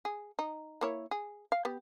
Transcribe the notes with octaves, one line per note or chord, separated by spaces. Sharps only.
G#4
D#4
A#3 E4 C#5
G#4
F5
B3 G4